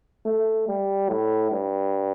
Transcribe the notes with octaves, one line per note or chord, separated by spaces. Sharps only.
A3
G3
A2
G2